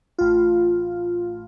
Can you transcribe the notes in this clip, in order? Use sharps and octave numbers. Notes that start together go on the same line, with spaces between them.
A1 F4